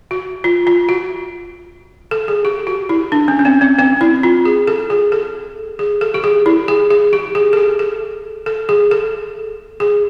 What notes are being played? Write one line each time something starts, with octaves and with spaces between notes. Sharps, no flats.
F#4
F4
F4
F#4
A4
G#4
G4
F#4
E4
D4
C#4
C#4
C4
C4
C4
E4
F4
G#4
A4
G#4
A4
G#4
A4
G4
G#4
E4
G#4
G#4
G4
G#4
A4
G#4
A4
A4
G#4
A4
G#4